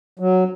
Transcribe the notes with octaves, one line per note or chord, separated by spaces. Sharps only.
F#3